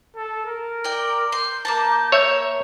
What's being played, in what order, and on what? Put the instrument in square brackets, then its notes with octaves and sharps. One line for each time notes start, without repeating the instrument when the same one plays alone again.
[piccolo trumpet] A4
A#4
[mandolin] D5 G5
[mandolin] C6 [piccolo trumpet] G6
[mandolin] A#3 C#4 A5
[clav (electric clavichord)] C#5 E5